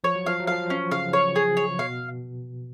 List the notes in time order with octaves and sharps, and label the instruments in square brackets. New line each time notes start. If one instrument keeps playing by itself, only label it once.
[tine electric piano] F3 [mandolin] C#5
[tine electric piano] F#3
[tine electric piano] F3 [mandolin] F5
[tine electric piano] F#3
[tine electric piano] F3 [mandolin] F5
[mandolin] C#4
[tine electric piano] C#3 [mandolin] F5
[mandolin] C#5
G#4
C#5
[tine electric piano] B2 [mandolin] F5